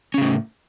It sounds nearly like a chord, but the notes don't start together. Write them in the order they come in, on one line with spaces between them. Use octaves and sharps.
C#4 C#3 A2